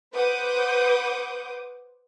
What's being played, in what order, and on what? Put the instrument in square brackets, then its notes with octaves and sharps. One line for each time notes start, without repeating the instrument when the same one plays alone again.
[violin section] B4 C5 F#5 D6 D#6 G6